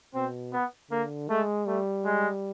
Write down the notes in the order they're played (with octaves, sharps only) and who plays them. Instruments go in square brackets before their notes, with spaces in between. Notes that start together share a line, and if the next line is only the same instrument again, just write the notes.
[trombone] B2 [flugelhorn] C4
[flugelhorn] B3
[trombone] D3 [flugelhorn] A#3
[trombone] G#3 [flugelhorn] A3
[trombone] G3 [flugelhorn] A3
[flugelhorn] G#3